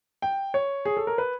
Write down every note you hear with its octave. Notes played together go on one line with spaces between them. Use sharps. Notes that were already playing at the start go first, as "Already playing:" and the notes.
G5
C#5
G#4
A4
A#4
B4